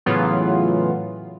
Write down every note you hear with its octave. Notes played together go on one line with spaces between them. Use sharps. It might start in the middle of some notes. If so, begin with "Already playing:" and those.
A2 C#3 E3 F#3 B3 F4